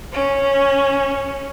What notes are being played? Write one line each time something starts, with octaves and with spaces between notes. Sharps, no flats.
C#4